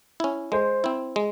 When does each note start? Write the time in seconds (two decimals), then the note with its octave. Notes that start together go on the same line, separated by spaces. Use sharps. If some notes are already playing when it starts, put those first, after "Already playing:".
0.20 C#4 E4
0.52 G#3 C5
0.84 C4 E4
1.16 G#3